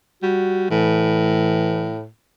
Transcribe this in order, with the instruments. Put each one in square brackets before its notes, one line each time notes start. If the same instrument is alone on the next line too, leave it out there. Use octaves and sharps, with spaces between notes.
[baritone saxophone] G3 [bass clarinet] F#4
[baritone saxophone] A2 [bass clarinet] E3